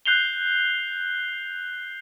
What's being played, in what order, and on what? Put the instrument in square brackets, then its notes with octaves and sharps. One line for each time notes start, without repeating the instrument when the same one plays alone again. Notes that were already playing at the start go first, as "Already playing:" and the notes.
[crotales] F#6 G6 C7 F7 G7